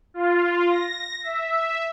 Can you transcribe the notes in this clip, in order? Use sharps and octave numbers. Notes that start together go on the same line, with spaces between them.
F4
A#6
E5